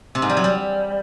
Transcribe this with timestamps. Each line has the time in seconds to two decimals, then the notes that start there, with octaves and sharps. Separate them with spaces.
0.15 C3
0.22 G#2
0.29 G3
0.37 F#3
0.44 G3